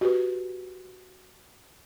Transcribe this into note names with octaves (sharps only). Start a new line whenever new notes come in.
F#4 G4 B4